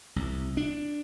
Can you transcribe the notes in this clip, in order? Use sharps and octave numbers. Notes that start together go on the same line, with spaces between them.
C2
D4